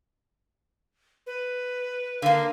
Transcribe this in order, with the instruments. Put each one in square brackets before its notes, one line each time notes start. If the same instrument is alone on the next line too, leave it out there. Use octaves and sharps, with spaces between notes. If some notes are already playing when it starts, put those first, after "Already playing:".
[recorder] B4
[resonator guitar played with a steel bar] D3 A#3 [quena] F5